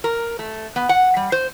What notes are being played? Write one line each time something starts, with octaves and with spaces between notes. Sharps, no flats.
A#4
A3
B3
F#5
G3
C5